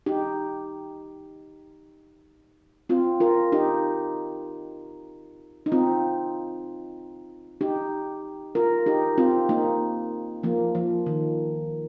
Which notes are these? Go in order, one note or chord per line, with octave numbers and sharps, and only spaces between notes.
D#4 G4
C4 F4
F4 A#4
D#4 G4
D#4
C4 F4
D#4 G4
F4 A#4
D#4 G4
C4 F4
A#3 D#4
F3 A#3
F3
D#3